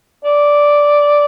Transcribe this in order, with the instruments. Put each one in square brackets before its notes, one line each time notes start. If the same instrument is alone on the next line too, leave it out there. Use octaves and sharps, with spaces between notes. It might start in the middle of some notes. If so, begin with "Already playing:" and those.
[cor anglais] D5